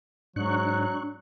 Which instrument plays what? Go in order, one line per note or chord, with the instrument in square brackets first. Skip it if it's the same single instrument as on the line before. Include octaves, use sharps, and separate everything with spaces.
[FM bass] G#2 [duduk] F#3 [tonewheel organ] D4 C#6 F#6